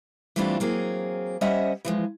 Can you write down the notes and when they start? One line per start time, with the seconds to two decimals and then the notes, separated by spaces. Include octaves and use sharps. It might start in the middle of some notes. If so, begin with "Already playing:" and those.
0.36 E3 G3 A3 C4 D4 F4
0.60 F#3 A#3 C4 G#4
1.41 G3 C#4 C5 D#5 E5 F#5
1.85 E3 F3 G#3